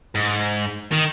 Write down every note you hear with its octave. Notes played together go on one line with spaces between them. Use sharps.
G#2
D#3